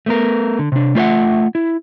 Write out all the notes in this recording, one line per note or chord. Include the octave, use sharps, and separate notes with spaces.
A3 B3 A#4
D3
C3 D4
A3 F4 C5 E5 F#5
E4